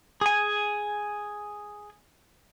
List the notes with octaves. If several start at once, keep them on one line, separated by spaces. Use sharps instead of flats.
G#4 G#5